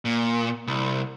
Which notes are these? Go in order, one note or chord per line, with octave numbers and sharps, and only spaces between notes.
A#2
C2